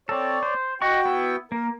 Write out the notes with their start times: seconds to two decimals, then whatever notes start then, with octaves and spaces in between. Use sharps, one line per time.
0.09 C4 A4 C#5 D5
0.43 C5
0.82 F#4 D#5 F#5 G5 C#6
1.05 B3 E4
1.52 A#3 A#4